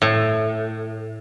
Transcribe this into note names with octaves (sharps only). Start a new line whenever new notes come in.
A2